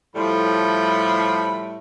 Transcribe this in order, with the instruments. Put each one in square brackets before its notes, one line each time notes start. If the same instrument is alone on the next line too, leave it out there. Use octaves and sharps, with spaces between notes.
[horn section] A2 G3 A3 [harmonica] F3 B5 C6